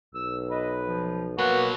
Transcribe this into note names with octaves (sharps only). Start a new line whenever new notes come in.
B1 E6
B4 D#5
F3
B2 F#3 A#3 F#4 B4